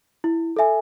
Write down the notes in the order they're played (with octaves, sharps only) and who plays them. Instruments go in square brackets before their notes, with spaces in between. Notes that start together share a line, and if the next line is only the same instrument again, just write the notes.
[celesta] E4
A4 E5 G#5